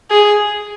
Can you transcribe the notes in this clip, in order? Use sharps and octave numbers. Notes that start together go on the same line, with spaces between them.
G#4